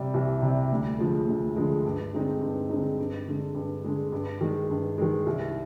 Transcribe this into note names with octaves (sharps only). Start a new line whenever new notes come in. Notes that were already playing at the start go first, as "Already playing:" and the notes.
Already playing: C3 G3
C2
C3 G3
D2
D3 F3 G#3
D2
D3 F3 G#3
G2
D3 G#3 C4 D#4
G2
D3 G#3 C4 D#4
G2
D3 G#3
G2
D3 G#3
G2
D#3 G#3
G2
D#3 G#3
C2